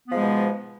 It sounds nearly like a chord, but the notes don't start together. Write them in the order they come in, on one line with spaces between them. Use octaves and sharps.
B3 F3 G#2 G#3 B2